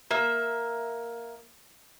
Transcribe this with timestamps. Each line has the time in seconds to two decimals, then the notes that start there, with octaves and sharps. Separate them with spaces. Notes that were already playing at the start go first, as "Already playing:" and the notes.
0.11 A#3 E5